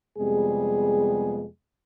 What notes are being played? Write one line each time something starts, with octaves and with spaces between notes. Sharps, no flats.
F2 C3 G3 G#3 B3 G#4